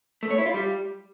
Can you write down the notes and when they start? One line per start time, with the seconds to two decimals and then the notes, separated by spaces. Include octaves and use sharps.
0.23 A3
0.30 C#5
0.38 E4
0.46 F4
0.54 G3